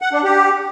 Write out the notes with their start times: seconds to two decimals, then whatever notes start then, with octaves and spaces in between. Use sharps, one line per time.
0.02 F#5
0.13 D4
0.24 G4